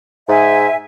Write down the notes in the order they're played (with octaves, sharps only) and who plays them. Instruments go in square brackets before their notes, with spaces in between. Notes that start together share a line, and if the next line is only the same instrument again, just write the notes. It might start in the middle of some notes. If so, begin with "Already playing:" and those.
[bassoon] G#2 [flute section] E5 G#5